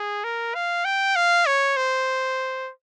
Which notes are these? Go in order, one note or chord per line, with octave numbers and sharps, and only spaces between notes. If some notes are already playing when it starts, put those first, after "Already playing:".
Already playing: G#4
A#4
F5
G5
F5
C#5
C5